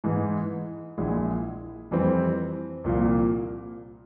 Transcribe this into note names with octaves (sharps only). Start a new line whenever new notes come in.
G#2 E3 G#3
A#1 A#2 G#3 E4 G#4
F2 E3 G3 C4
C2 A#2 F3 A#3